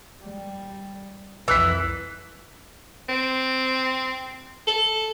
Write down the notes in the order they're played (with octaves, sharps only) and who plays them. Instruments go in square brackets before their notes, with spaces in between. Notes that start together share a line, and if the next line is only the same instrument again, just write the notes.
[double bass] G3
[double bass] C2 F2 [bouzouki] E3 [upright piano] E6 F#6 B6
[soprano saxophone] C4
A4